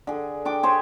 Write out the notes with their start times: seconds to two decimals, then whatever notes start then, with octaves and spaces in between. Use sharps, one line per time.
0.07 D3 G#4
0.45 D4 G5 D6
0.63 G4 G#4 C5 C#5